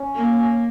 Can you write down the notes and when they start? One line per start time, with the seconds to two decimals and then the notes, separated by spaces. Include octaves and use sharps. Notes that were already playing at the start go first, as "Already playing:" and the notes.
Already playing: C#4
0.15 A#3